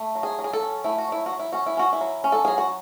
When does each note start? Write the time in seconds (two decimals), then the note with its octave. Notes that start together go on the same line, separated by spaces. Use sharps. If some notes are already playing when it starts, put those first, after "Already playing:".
Already playing: A3
0.15 F#3
0.23 G#4
0.39 F#3
0.44 G#4
0.53 A4
0.62 C#4
0.84 A3 E4
0.98 F#4
1.08 F#3 E4
1.26 F#4
1.31 F#3
1.39 E4
1.53 C#4 F#4
1.66 E4
1.77 C#4 F#4
1.93 E4
2.01 F#3
2.24 C#4
2.32 A4
2.45 F#3 G#4
2.58 F#4